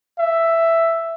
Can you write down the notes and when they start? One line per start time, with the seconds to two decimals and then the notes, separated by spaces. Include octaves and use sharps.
0.19 E5